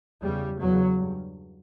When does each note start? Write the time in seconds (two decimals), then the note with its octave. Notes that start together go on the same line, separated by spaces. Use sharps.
0.22 E2 C#3 G3
0.61 E2 C#3 F#3
0.99 G2